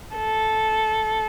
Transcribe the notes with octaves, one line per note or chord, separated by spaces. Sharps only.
A4